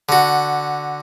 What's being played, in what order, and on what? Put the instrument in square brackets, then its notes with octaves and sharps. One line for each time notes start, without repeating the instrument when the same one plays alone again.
[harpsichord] D3 F#4